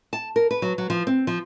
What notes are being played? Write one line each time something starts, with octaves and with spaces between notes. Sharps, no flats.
A5
A#4
B4
F#3
F#3
F3
C4
F3